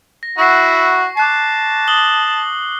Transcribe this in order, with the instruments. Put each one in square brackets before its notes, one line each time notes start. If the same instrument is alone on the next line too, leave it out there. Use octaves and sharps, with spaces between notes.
[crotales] A#6
[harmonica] E4 F#4 F#5 [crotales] C#6 A#6 C7
[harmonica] A5 [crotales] D6 F#6 C7
[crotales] D#6 F#7 G7